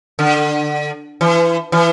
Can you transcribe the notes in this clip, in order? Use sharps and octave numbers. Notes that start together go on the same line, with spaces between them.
D3
E3
E3